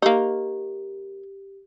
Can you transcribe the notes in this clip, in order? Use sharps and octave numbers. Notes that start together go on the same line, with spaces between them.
A#3 D#4 G4